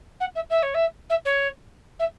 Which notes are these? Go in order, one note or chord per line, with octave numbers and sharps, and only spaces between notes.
F#5
E5
E5
C#5
E5
E5
C#5
E5